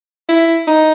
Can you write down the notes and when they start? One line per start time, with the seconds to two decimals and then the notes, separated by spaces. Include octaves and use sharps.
0.29 E4
0.67 D#4